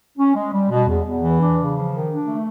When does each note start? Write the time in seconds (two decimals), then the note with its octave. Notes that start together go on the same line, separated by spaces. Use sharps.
0.18 C#4
0.35 G#3
0.52 G3
0.70 B2
0.87 E2
1.04 E2
1.21 E3
1.40 D4
1.56 C#3
1.73 F3
1.90 D#3
2.09 D4
2.25 A3